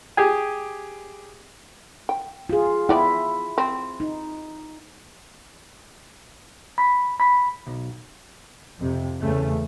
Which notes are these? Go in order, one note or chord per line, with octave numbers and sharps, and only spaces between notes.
G4 G#4 G#5
G5
F4 G#4
B3 E4 D5 G5
C4
D#4
B5
B5
B1
F2 C3
E2 C#3 A3